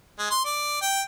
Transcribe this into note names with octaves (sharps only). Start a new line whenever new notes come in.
G#3
C6
D5
G5